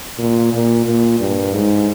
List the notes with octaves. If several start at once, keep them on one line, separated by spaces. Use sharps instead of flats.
A#2
A#2
A#2
G2
G#2